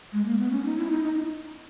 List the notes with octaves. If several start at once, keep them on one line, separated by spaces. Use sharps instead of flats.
G#3
A#3
B3
C#4
D#4
E4
D#4
D#4